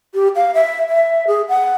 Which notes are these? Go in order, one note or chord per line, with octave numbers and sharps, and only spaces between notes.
G4
F5
E5
E5
G#4
F#5